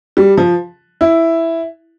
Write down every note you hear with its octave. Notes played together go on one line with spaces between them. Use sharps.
G3
F3
E4